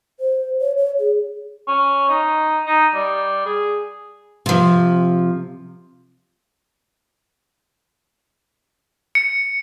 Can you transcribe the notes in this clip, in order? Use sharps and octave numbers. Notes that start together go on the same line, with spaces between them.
C5
C#5
C#5
G#4
C#4
D#4
D#4
G3
G#4
C3 F3
C#7